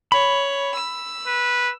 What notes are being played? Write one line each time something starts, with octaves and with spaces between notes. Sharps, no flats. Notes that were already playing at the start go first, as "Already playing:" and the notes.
C#5 B5
E6
B4